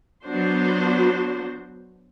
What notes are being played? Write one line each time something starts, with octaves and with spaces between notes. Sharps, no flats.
F#3 B3 D4 F#4 C5